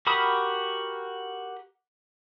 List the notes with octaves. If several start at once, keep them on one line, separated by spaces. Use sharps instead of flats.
F#4 G4 A#4 B5 D#6